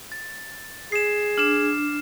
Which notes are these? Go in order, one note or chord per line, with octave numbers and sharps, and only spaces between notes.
A6
G#4 C7 E7
D4 F6 E7